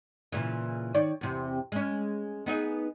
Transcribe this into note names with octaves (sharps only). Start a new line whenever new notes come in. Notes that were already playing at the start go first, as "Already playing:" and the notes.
A#2 C#3 E3
D#3 C#5 D5
E2 C3
G#3 C#4
B3 D#4 G#4